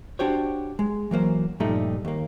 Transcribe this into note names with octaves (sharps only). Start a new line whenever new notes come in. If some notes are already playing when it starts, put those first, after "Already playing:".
D4 F#4 G4 C5 C#5
G#3
E3 F#3 A#3 C5
G2 A#2 F3 G3 A3 D#4
D#2 A#3